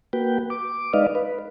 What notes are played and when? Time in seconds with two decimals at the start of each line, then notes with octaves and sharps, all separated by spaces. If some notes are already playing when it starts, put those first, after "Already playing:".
0.13 A#3 F#4 B4 G5
0.50 D6
0.93 G#3 D#4 B4 D5 D#5 F5
1.15 B4